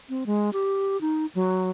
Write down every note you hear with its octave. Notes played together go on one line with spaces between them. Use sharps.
C4
G#3
G4
D#4
F#3